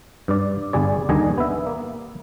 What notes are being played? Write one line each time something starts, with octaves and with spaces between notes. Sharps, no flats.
G2 D5
G1 G3 G#4 D5
D#2 D3 G3 D#5 G#5
B3 E5
A#3